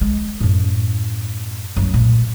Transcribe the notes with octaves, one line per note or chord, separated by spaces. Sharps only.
G#3
F#2 A2
F#2 A3
A#2 A3